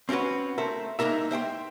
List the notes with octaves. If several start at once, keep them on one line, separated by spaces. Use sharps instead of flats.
C4 C#4 F4 F#4 B4
A3 A#4 C5 E5
G#3 A#3 D#4 A#4 E5
C5 E5 G5 C6